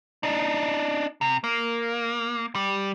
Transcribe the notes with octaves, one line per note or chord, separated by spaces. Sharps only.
D4 D#4
C3
A#3
G3